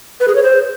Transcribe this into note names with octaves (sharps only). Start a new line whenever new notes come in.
B4
G#4
C#5
C5